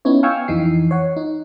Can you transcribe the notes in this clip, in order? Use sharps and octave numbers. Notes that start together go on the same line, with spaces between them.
B3 C#4 D#4 E4 C#5
F5 G5 G#5 C#6 E6 F6
F2 E3 D#4 C7
C#5 F#5
D#4